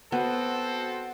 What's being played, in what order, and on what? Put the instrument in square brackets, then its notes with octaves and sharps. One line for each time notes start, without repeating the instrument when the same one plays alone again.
[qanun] B3 [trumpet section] C4 A4 C5 [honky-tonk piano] F#4